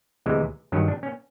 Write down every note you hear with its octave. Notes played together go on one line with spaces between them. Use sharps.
D2 C3 E3 G#3
G2 D#3 F#3 C#4
D4
C#4